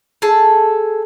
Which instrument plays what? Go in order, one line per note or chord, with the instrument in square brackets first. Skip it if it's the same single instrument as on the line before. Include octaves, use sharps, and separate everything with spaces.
[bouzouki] G#4 A4 A5